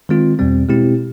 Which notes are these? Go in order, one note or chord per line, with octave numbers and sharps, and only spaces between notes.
D#3 G#3 C4 F4
E2 B2 G3 C4
B2 G#3 C4 E4 G4